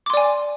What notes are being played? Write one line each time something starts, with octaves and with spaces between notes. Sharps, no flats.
D5 G#5 C6 D6